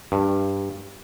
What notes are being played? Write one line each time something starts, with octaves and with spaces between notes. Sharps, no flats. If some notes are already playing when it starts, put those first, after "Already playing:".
G2